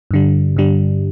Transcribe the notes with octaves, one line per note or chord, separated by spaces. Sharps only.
G2 D3 G3
G2 D3 G3